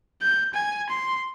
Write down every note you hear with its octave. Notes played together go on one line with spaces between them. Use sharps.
G6
G#5
C6